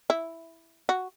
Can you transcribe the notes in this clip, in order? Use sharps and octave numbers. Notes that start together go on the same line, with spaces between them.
E4
F#4